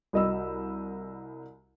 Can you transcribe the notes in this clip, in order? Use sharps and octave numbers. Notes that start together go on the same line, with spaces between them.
C2 F#4 D#5 B5 E6